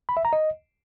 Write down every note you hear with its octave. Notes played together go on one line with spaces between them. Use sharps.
B5
E5
A#5
D#5